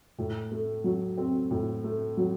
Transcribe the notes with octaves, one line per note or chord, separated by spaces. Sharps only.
A2
A3
F#3
C4
A2
A3
F#3